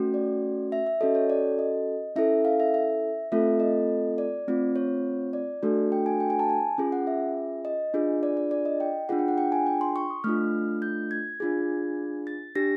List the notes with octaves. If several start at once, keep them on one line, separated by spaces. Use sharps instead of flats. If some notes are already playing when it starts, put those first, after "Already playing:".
Already playing: A3 C#4 F#4
D5
E5
E5
C#4 F#4 A4 D#5
C#5
D5
D#5
C#4 E4 A4 E5
F5
E5
E5
A3 C4 F4 A4 E5
D#5
D5
A3 C4 F4
C#5
D5
A3 D4 F#4 A4
G5
G#5
G5
G#5
A5
G#5
C#4 F4 G#4
F#5
E5
D#5
D4 F4 G#4
D5
D5
D5
D#5
G5
D4 F4 G#4 F#5
G5
F#5
G5
G#5
G5
C6
C#6
D#6
A3 D4 F4 F6
G6
G#6
D4 F4 G#4
A6
D4 G4 A#6